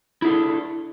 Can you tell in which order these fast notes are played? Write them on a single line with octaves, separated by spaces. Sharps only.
E4 G#4 A4 D4